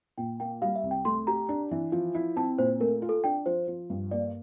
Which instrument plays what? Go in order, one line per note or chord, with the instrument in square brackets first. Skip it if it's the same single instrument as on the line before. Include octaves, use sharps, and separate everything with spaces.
[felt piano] A#2 [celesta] G5
[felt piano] A#3 [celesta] G5
[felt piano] G3 [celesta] F5
[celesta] E5
[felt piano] C2
[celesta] G5
[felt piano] A3 [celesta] C6
[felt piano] G4 [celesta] A#5
[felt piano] D4
E3
F3
E4
[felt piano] C4 [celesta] A5
[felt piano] A#2 [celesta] C5
[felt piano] A3 [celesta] A#4
[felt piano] F4
[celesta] A4
[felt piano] D4 [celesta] G5
[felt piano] F3 [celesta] C5
[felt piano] F3
G2
[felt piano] A#3 [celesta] D5